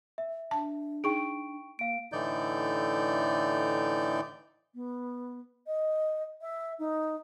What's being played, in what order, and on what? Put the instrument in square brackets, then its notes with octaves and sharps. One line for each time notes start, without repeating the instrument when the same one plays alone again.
[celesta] E5
[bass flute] D4 [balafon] A5
[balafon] D#4 G#4 [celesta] G5 C#6 D7
[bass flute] A#3 [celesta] F5 D7
[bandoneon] A2 D3 E3 D#4 D5 G6
[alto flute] B3
D#5
E5
D#4